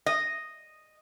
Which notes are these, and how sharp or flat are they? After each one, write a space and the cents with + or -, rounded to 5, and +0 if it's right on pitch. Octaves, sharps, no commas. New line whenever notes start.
D#5 -5